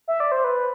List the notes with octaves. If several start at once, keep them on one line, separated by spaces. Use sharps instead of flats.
E5
D5
C5
B4